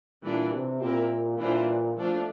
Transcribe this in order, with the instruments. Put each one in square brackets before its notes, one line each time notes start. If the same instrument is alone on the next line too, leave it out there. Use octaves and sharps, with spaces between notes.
[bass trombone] A#2 [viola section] E3 G3 D4
[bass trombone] C3
[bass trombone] A#2 [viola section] C4 E4 G4 A#4
[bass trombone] A#2 [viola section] E3 G3 D4 F4 C5
[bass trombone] F3 [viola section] A3 D4 F4